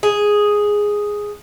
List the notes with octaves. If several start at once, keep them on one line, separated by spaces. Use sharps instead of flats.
G#4